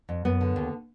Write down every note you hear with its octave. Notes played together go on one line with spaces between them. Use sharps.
F2
F#2 B3
D3
D#2